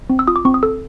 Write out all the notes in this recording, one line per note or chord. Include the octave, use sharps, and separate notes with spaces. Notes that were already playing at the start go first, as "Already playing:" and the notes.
C4
E6
F4 D#6
D6
C4 C#6
D#6
A4 E6